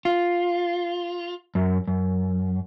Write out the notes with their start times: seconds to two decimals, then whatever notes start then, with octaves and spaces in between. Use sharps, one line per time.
0.05 F4
1.55 F#2
1.88 F#2